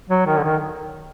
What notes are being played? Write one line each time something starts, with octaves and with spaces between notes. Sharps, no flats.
F#3
D#3
D3
D#3